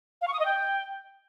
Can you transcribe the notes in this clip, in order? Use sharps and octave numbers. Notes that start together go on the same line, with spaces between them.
F5
C#6
D#6
D#5
G5